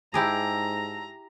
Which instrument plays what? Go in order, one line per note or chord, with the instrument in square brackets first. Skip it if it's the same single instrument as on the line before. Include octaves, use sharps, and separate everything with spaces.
[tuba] G#2 [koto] E4 G4 G#4 [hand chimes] A5 E6 [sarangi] A#5